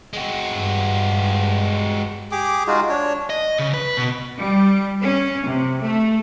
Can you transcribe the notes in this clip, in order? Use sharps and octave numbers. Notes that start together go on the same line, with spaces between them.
G#3 F#4
G2
G4 G#4 D6
G#3 D#4 F4 F#4
D4 C#5
D#5
C#3
B4
B2
G3
C#4
C3
A3